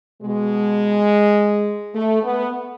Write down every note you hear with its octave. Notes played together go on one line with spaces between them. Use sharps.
B2 G#3
A3
B3